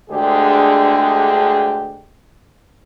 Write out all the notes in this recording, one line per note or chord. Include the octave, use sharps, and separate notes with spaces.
D2 D3 G#3 D4 G4 G#4